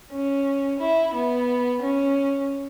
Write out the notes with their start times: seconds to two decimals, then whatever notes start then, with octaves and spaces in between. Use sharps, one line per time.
0.11 C#4
0.79 E4
1.13 B3
1.81 C#4